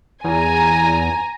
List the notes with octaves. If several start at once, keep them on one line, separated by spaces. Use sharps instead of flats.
E2 G#5 A#5